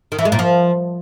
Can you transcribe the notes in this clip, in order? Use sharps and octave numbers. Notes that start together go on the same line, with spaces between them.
D#3
E3
G#3
A#2
F3